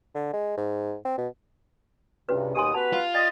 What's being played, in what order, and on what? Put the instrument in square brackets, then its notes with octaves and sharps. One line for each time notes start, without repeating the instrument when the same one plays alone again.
[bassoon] D3
G#3
G#2
C4
B2
[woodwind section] C#2 G2 C3 [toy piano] C#4 F#4 B4
[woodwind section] D#2 B2 D#6 [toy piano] G4 G#5 C6
[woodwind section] B3 F#4 B4 [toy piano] A5 [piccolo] F7
[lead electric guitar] F4
[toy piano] D5 G5 [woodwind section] D#5 [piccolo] A6